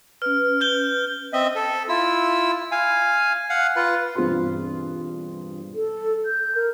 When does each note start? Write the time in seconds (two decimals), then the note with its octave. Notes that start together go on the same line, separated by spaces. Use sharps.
0.22 C#4 B4 F6
0.61 F6 G6 G7
1.33 C4 D#5 E5
1.56 A4
1.89 E4 F4 E6
2.72 F5 G#5
3.50 F5 F#5
3.76 F4 B4
4.15 E1 G2 C4 F4 G#4 C6
5.75 A4
6.26 G6
6.55 A#4